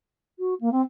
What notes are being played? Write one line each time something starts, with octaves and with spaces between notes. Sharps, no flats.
F#4
A#3
C4